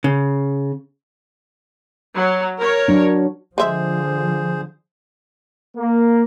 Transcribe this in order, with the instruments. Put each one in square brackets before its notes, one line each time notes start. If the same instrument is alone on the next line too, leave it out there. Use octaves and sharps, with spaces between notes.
[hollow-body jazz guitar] C#3
[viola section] F#3
A#4 C#5
[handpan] F#3 D4
[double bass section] D3 F3 [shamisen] G#3 E5 [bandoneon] G#4 C5
[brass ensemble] A#3